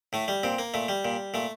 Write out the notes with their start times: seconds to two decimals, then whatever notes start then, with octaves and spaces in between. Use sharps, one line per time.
0.13 A2 A3
0.28 G3
0.43 A#2 C4
0.59 A#3
0.74 A#2 A3
0.88 G3
1.05 A#2
1.34 A#2 A3